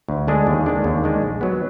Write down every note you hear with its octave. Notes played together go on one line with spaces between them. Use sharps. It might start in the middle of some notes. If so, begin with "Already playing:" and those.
D2
D3 G#3 D4 G#4
D#2
D#3 G#3 D4
D#2
D#3 G#3 D4
A#1
F#3 B3